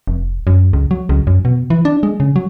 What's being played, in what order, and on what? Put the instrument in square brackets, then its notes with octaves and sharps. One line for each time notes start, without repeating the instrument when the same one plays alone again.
[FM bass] F1
F#2
C#2
F#3
C#2
F#2
B2
E3
D4
G#3
C#3
F#3